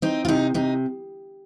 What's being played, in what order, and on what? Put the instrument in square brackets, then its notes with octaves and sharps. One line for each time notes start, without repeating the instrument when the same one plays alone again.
[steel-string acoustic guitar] C4 D#4
F4
C3 D#4
C3 D#4